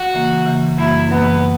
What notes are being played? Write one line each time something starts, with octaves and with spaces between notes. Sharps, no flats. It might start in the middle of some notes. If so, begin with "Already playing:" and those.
Already playing: F#4
C#3 E3 A#3
C#3 E3 A#3
F#2 E3 G3 A#3 E4
F#2 E3 G3 A#3 B3